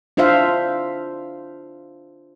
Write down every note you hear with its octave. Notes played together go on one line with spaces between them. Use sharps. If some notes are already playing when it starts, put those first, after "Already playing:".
D4 F4 C5 E5 F5